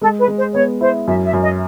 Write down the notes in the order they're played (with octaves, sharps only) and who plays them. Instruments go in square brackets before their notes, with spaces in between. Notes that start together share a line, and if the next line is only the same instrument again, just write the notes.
[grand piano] G#3 [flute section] A4
[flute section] B4
[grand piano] G#3
[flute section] C5
[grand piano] B3 [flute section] C#5
[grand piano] E4 [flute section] C5
[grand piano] F#2 [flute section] E5
[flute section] E5
[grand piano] F#2
[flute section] D#5